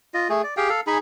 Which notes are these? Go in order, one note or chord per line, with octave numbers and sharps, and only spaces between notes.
F4 D#5
A3 G#4
D5
G4 G#4 F5 G5
A4 F5
D#4 G#4 G#5 B5